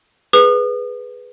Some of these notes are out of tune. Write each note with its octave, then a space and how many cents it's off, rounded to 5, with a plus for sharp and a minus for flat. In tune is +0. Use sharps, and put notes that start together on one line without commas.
G#4 +5 B4 +0 D#6 -40